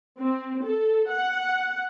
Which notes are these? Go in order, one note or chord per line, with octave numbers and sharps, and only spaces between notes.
C4
A4
F#5